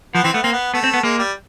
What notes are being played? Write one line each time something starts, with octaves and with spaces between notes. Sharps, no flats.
F3 B3
E3 C4
A3 B3
A#3 C4
B3
A3 B3
C4
B3
G#3 A#3
G3